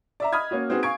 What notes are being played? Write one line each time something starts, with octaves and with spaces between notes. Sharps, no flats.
D5 E5 A#5
D#5 B5 D#6 F6 G#6
A#3 C#4 F#4
C4 D#4 F#4 G#4 B4
F5 G#5 C#6 G#6 D7